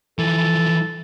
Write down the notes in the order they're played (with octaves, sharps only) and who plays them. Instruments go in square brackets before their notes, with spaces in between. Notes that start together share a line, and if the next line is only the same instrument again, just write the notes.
[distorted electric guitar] E3 F3 [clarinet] A4